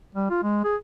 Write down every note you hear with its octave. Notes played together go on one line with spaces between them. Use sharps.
G3
F4
G#3
G#4